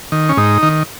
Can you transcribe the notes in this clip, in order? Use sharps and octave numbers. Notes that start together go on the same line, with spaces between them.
D#3
C#4
G#2 D#4
D#3